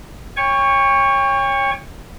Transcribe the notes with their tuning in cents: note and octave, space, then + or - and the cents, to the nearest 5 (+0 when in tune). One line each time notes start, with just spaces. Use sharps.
C#5 +0 G5 +35 C#6 +0